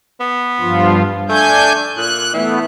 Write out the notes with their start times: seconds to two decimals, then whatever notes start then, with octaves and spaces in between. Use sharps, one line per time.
0.20 B3
0.60 G2 F3 F4
1.29 A3 D4 G#5 G6
1.97 A#2 F#6
2.33 E3 A3 B3